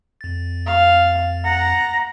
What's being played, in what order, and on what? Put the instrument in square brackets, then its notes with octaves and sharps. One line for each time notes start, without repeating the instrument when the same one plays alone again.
[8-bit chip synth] F2 A6
[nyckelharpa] F5
[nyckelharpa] F#5 [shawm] A#5